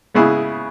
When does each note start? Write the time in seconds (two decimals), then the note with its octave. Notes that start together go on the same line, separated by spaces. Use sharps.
0.14 C#3 G#3 B3 E4 G#4